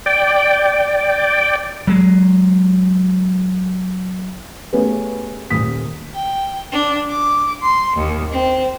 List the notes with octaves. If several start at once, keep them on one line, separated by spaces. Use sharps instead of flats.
D5 G5
F#3 G#3
A3 B3 C#4 G4 G#4 B4
D#1 A#2 D#6 B6
G5
D4
D6
C6
D#2
C4